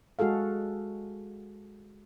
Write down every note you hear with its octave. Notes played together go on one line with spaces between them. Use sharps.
G#3 F#4 G#4 A4 F5